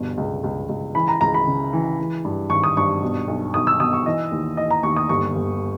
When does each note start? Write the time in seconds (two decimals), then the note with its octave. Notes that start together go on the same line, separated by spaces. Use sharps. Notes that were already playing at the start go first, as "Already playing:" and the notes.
Already playing: G1 B2
0.18 C#2
0.44 C#2
0.69 C#2
0.95 E3 B5
1.08 A#5
1.21 C#2 A#5
1.34 B5
1.47 C#3
1.73 E3
1.99 E3
2.25 G2
2.50 G#1 C#6
2.64 D#6
2.77 G2 C#6
3.02 B2
3.28 B1
3.54 B1 D#6
3.67 E6
3.80 B2 D#6
3.93 C#6
4.06 E3 D#5
4.32 D#2
4.57 E3 D#5
4.70 A#5
4.83 D#2 C#6
4.96 D#6
5.09 G1 C#6
5.35 G1